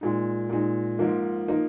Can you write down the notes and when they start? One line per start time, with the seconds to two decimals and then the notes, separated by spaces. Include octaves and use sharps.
0.01 A#2 G#3 D#4
0.49 A#2 G#3 D#4
0.99 G#2 F3 A#3 D#4
1.48 F3 A#3 D#4